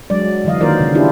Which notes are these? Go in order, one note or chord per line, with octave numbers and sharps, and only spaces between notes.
F#3 G#3 D5
D3 E3 F#3 D#5 F5
D#3 A#3 F4 A#4 C5 D5
C#3
D4 E4 F4 G4